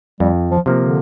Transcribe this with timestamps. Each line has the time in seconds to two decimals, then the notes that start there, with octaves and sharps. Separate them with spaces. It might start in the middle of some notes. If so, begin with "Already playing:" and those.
0.20 F2 G3
0.51 F3
0.66 C3 F3 A#3
0.82 D3